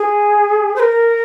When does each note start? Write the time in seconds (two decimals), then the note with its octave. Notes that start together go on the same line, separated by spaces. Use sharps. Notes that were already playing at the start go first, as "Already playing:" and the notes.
Already playing: G#4
0.76 C5
0.80 A#4